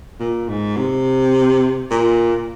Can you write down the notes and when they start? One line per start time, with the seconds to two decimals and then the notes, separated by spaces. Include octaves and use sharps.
0.20 A#2
0.48 G#2
0.77 C3
1.91 A#2